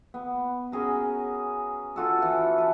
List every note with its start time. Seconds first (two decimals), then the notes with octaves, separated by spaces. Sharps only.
0.14 B3
0.72 C#4 F#4 G#4 A#4
1.96 F4 F#4 A4
2.22 E3
2.58 B4 A5